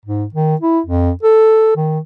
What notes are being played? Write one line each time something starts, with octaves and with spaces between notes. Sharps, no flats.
G#2
D#3
E4
F2
A4
D#3